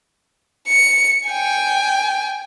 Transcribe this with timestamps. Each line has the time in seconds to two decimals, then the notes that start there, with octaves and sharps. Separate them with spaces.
0.68 C#7
1.28 G5 G#5